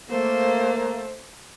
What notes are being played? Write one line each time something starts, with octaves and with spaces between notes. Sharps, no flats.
A3 A#3 C5